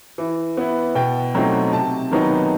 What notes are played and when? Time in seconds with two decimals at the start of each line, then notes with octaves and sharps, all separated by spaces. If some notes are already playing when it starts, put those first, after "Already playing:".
0.18 E3
0.57 B3 E4
0.95 B2 G5
1.35 F#3 A3 C4 D#4
1.73 C3 A5
2.11 D#3 F#3 B3 D#4